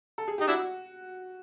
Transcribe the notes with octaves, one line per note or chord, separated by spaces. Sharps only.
A4
G#4
D#4 G4
D4 E4 F#4